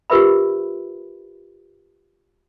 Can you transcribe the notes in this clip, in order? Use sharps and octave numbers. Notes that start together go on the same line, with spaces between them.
F4 G4 A#4 B4 E5 B5